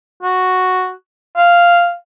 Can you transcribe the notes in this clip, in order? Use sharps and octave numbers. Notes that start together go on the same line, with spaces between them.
F#4
F5